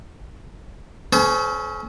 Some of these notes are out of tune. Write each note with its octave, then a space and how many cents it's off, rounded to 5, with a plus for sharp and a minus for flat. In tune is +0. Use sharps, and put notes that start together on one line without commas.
C#4 +0 A4 -45 C5 -40